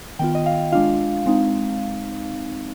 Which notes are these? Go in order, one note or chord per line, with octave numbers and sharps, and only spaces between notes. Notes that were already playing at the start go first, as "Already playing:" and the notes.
D#3 B3 F4 G5
D#5
F5
G#3 D4 F4 F5
G#3 C4 D#4